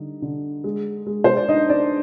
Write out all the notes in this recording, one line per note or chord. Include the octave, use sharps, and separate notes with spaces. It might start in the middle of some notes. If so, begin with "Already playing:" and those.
Already playing: D3 G3 D#4
D3
G#3
G#3
C5
D5
D4 D#4 D#5
D4 D5